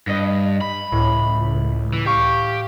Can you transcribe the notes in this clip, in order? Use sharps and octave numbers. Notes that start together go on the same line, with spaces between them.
G2 D#5 A#6
B5
C#2 A2
E3
G4 F5 C#6